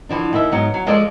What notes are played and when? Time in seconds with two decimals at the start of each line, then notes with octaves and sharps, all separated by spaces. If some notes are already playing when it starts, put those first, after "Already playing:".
0.09 D3 E3 F3 D4
0.33 D#2 D#3 E4 E5
0.52 G#2 F#3 B3
0.74 F#3
0.86 F3 G#3 G#4 A4 C5 D5